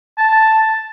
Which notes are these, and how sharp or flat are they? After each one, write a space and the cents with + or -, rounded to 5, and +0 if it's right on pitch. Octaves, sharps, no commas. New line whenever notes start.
A5 +0